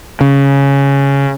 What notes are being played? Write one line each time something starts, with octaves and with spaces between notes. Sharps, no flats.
C#3